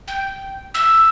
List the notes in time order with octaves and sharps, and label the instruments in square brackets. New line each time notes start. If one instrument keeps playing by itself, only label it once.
[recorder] G5
E6